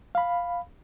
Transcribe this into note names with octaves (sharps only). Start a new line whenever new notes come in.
F5 B5